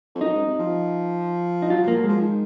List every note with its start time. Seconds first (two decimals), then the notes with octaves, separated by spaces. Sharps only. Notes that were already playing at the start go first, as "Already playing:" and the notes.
0.15 F2
0.21 F#2 D#4
0.34 G#2
0.46 C3
0.59 F3
1.62 D#4
1.70 F#3 F4
1.83 F3 A#3
1.96 F#3
2.04 F3 G#3
2.21 D#3